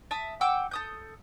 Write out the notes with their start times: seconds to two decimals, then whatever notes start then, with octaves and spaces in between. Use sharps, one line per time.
0.11 E5 A5 D#6
0.41 F#5 G5 D6 E6
0.71 A4 D#6 G6